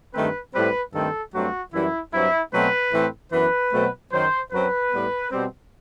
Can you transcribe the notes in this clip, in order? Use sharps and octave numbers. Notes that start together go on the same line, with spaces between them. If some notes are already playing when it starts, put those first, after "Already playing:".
G2 D#3 A3 C4 B4
A2 G3 C4 B4
G2 D#3 A3 C4 A4
G2 F#3 A3 C4 F#4
F#2 E3 G3 E4
G2 F#3 C4 E4
B2 F#3 A3 C4 B4
A2 E3 A3 C4
F#2 E3 B3 B4
B2 F#3 A3 C4
F#2 D#3 F#3 C5
F#2 F#3 C4 B4
A2 G3 B3
B2 G3 C4